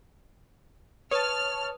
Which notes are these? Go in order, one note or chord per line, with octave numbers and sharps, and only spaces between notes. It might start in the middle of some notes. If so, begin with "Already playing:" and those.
B4 C#5 A5 D#6 F6